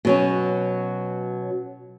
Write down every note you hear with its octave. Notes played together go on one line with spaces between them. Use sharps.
B2 F#3 C#4